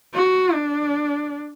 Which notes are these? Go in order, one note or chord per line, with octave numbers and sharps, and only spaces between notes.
F#4
D4